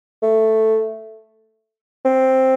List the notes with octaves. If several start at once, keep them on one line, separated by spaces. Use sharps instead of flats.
A3
C4